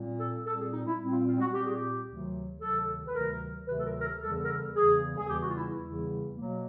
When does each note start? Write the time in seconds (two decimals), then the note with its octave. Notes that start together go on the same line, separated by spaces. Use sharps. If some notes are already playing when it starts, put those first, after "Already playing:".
Already playing: A#2 G3 C4
0.19 A4
0.45 A#2 G3 C4 A4
0.59 G#4
0.72 D#4
0.86 E4
0.99 A#2 G3 C4
1.12 F4
1.26 F4
1.39 F#4
1.53 A#2 G3 C4 G4
1.64 G#4
1.75 G4
2.06 D2 C3 D#3 F#3
2.60 D2 C3 D#3 F#3 A4
3.07 B4
3.14 D2 C3 D#3 F#3 A#4
3.67 D2 C3 D#3 F#3 B4
3.78 A4
3.85 A#4
3.99 A#4
4.03 A4
4.20 E2 C#3 E3 G3 A4
4.43 A#4
4.48 A4
4.75 E2 C#3 E3 G3 G#4
5.17 G#4
5.28 E2 C#3 E3 G3 G4
5.41 F#4
5.49 F4
5.55 E4
5.68 E4
5.82 E2 C#3 E3 G3
6.35 B2 F#3 A#3